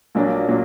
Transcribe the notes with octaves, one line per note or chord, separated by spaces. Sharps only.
A#1 A#2 F#3 A#3 D4
A#2 F#3 A#3 D4